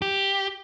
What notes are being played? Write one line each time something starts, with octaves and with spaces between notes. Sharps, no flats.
G4